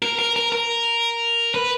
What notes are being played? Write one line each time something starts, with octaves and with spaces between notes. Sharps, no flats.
A#4
A#4
A#4
A#4
B4